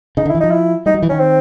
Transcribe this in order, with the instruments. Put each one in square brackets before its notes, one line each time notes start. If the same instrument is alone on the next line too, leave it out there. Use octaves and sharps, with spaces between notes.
[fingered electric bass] C#3 [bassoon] D#4
[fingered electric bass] D3
[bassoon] E4
[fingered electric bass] E3
[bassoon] D#4
[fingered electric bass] F3
[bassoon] E4
[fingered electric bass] G3 [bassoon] D#4
[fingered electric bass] F#3
E3
[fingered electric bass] D#3 [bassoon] C#4
[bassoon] C4